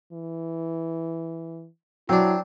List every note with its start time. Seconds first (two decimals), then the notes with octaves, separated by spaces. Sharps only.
0.13 E3
2.09 F#3 C4 D4 E4